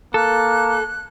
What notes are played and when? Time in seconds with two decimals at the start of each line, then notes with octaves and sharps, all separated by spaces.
0.14 A#3 A4 F#6